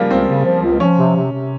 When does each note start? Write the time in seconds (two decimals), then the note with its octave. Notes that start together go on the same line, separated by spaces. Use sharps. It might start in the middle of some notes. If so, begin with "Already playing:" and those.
Already playing: C#3 F3 G3 A#3
0.11 C#2 C4
0.28 C#3
0.45 F3
0.63 C#2
0.80 F3 C#4
0.97 C3
1.14 C3
1.32 C3